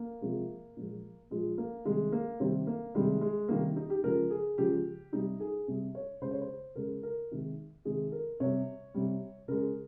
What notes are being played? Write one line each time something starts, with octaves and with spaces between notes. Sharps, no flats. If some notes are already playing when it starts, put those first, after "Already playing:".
Already playing: A#3
C3 F3 G#3
A#2 F3 G#3
A#2 F3 G#3
A#3
C3 D#3 G3 G#3
A#3
C3 D#3 G3 C4
A#3
C3 D#3 G3 G#3
G#3
C3 D#3 G3 A#3
D#4
G4
C#3 F3 G#3 A#4
G#4
C#3 F3 G#3 G4
C3 G3 D#4
G#4
C3 G3
C#5
C#3 G#3 C5
C#5
C5
C#3 G#3 A#4
A#4
C3 D#3 G#3
C3 D#3 G#3 G#4
A#4
C3 G3 C#5
C3 G3
C#3 G#3 A#4